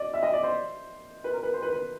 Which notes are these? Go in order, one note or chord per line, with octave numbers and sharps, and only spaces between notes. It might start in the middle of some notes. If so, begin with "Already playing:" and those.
Already playing: D5 D#5
E5
D#5
D5
C5
B4
A#4
B4
C5
B4
B4